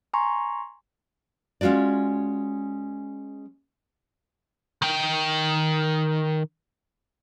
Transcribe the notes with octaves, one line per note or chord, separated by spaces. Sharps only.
G#5 A#5 C6 C#6
G#3 C#4 F4 F#4 D5
D#3 G5